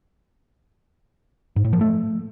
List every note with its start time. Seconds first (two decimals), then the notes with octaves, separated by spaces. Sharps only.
1.56 G#2
1.65 A2
1.73 F3
1.81 A3